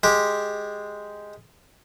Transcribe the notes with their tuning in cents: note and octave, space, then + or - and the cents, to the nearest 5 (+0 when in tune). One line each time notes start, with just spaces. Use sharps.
G#3 +0 G4 +0